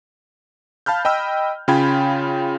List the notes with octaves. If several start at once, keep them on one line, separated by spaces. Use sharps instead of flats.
F5 A5 B5 F6 G6
D#5 G5 B5 E6
C#3 C#4 F4 G5 B5 G#6